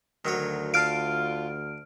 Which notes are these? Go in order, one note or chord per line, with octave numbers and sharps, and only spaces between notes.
D2 D#3 F#3 C#5
F4 F5 A5 F6 D7